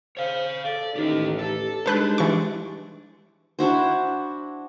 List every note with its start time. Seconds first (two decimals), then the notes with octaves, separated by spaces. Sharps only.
0.17 C5 C#5 F5
0.65 A4 D5
0.96 A1 D#2 D#4 G4
1.39 G4 A4
1.86 G3 G#3 D4 D#4 G4 A4 B4 F#6
2.18 E3 C#6
3.59 D4 E4 F#4 C5